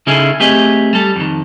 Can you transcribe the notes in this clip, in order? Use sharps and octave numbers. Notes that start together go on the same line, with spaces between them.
C#3 C#4 D#4 E4 G#4 A4
A3 C4 G4 G#4 B4 D#5
G3 A4
F2 D#3